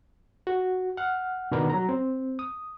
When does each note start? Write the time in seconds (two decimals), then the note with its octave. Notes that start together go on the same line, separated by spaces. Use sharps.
0.47 F#4
0.97 F#5 F6
1.52 B2 D#3 B3 D4 A#4
1.70 F#3 A#5
1.89 C4
2.39 D#6